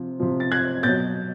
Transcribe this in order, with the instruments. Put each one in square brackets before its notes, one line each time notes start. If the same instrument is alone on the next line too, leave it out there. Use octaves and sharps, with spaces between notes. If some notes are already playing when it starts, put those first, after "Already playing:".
Already playing: [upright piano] C3 F3
C3 F3
A6
F#6 G#6
B2 F#3 G6 A6